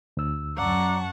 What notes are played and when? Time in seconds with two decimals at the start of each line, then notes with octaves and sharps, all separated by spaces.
0.17 D2 E6
0.57 F#2 F#3 D5 F#5 A5 A#5 C#6 D6